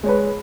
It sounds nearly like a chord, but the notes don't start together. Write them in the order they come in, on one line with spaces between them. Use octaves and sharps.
G#3 C#5 B4